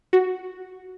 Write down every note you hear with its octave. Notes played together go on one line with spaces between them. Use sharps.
F#4